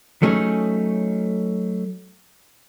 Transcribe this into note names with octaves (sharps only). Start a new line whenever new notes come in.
F#3 A3 C#4 D#4 G#4